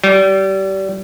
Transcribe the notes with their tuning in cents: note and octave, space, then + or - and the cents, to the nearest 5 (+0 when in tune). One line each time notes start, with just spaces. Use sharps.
G3 -30